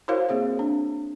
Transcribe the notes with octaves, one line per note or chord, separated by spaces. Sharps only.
E4 F#4 A#4 C5 C#5 F5
A#3 C4 G#4 F5
D4